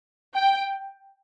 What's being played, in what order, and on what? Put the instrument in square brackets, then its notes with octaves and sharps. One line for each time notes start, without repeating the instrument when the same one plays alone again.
[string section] G5